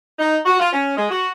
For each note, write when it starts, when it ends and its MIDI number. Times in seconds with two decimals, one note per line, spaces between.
0.19 0.37 63
0.45 0.56 66
0.59 0.68 65
0.73 0.96 61
0.97 1.10 56
1.11 1.30 66